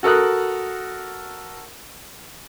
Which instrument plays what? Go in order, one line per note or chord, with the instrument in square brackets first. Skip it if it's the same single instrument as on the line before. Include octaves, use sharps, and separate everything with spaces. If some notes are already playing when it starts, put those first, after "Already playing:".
[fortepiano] F#4 A4 A#4 D#6 F#6